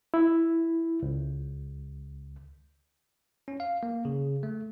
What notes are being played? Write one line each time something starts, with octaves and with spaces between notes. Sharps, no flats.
E4
C#2
C#4
F5
A#3
C#3
A3